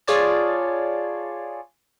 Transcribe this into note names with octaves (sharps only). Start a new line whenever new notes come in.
F4 G#4 C#5 D5 A5